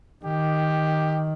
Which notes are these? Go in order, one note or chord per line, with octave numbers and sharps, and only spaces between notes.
D#3 G4